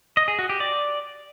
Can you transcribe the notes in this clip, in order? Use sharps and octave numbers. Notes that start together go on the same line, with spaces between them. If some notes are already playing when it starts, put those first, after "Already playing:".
D#5
G#4
F#4
G4
D5